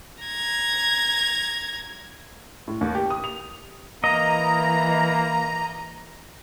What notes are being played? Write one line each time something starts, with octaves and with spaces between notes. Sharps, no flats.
A#5 G#6
A2
D#2
G4
D#6
F7
E3 A#3 D#5 A#5